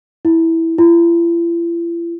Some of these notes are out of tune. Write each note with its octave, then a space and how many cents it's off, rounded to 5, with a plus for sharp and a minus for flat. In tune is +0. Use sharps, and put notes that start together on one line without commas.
E4 -10
E4 +45